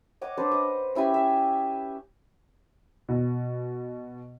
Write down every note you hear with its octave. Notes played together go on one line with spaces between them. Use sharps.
C#5 D#5 F#5 D6
D4 B4 C5
D#5
C#4 E4 G4 G#5
E5
B2